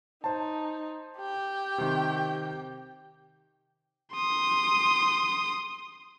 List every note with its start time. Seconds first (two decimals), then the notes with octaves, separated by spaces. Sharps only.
0.24 D#4 C5 A5
1.17 G4 G5
1.78 C3 D#3
4.14 C6 D#6